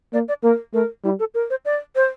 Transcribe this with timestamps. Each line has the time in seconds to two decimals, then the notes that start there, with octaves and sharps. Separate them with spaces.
0.13 A#3 D5
0.28 D5
0.43 A#3 A#4
0.74 A3 A#4
1.04 G3 E4
1.19 A4
1.34 A#4
1.50 C5
1.65 D5
1.96 C5